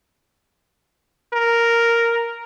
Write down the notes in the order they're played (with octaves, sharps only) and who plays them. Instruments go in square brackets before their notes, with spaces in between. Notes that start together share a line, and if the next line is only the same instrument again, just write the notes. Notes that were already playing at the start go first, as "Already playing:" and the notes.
[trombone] A#4